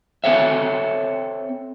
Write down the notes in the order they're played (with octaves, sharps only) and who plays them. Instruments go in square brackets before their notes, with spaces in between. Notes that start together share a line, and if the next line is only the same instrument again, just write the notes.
[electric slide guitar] C4 A4 C#5 E5